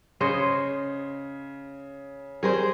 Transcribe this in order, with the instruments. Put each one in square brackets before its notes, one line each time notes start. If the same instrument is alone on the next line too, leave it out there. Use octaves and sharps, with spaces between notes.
[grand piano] C#3 [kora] C5 C#5 D#5
[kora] G3 [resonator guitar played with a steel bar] G#4 A#4 C5